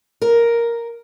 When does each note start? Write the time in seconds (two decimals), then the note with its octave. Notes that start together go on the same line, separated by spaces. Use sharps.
0.22 A#4